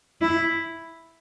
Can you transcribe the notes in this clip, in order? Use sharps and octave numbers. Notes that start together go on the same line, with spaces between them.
E4